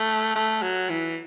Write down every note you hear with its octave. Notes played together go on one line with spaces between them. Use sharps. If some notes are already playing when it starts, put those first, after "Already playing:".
Already playing: A3
A3
F#3
E3